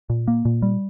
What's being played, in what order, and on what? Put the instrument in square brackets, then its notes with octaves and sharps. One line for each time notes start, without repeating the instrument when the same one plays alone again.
[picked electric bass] A#2
A#3
A#2
G3